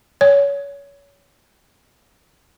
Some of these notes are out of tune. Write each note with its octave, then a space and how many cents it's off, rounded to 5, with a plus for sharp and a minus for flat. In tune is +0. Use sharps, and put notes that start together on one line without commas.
C#5 +25